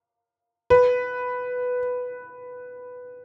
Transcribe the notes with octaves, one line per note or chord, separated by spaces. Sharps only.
B4